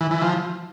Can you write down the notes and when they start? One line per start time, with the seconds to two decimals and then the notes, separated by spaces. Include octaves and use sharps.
0.01 E3
0.11 E3
0.22 F3